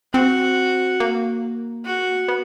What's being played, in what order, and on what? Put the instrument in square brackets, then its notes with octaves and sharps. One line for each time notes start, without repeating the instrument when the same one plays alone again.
[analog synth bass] C4 [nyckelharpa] F#4
[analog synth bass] A#3
[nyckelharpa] F#4
[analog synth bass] B3